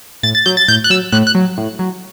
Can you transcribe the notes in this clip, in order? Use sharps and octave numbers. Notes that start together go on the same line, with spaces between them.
A2 A6
A6
F#3 G6
A6
A2 G6
F#6
F#3 E6
A2 F#6
F#6
F#3
A2
F#3